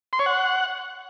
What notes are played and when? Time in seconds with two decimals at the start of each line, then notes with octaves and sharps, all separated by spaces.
0.13 C6
0.19 C#5
0.26 F#5